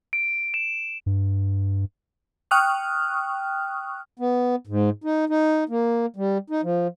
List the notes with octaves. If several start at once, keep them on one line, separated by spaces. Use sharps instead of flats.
D7
E7
G2
G5 C#6 D#6 F6 F#6
B3
G#2
D#4
D#4
A#3
G3
D#4
F3